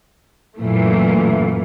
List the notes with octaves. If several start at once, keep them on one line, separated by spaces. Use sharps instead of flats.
F#2 A#2 E3 A3